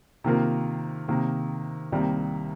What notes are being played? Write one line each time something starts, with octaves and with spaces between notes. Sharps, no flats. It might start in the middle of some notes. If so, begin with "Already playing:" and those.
C3 D#3 A#3 F4 A#4
C3 D#3 A#3
C2 C3 D#3 G3 A#3